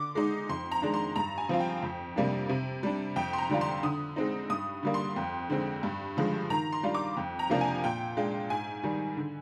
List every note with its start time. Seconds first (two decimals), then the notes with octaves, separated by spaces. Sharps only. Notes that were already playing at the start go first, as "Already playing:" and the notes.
Already playing: D3 D6
0.15 G#3 D#4
0.49 F2 C6
0.71 A#5
0.82 D#3 G#3 D4
0.94 C6
1.16 G2 A#5
1.38 G#5
1.49 F3 C4 F4
1.60 G5
1.83 F2
2.16 C3 G3 A#3 D4
2.49 C3
2.83 G3 D4
3.16 F2 G5
3.33 C6
3.38 A#5
3.49 D3 G3 D4 F4
3.61 C6
3.83 D3 D#6
4.16 G#3 C4 D#4
4.50 G2 D#6
4.83 D3 G3 A#3
4.94 C6
5.16 F2
5.50 D3 G#3 C4
5.83 G2
6.17 D3 F3 G#3
6.50 D#3 A#5
6.72 C6
6.83 G3 D4 F4
6.94 D6
7.17 F2
7.39 A#5
7.50 C3 F3 A#3 D4
7.61 G#5
7.84 A#2 G5
8.17 G#3 D4 F4
8.50 G#2 G#5
8.83 D#3 G3
9.17 D3